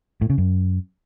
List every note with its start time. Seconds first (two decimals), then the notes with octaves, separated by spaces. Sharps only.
0.21 A2
0.30 C#3
0.38 F#2